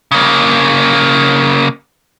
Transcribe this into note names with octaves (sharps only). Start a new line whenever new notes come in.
C#3 A#3